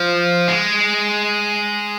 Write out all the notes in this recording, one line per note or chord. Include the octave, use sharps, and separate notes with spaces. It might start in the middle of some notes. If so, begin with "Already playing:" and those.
Already playing: F3
G#3